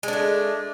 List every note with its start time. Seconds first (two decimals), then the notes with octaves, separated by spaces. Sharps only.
0.03 G#3
0.08 D4
0.13 A3